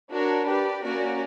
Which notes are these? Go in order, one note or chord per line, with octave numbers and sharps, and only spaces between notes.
D4 F#4 A#4 C#5
G4 B4 D5
A#3 C#4 F#4 A#4 D5